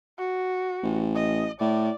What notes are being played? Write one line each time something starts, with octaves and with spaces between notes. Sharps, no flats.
F#4
A1
D#5
A2 D5